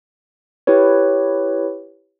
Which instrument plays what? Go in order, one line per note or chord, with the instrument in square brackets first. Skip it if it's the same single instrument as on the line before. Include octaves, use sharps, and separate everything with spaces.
[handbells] E4 G4 B4 C#5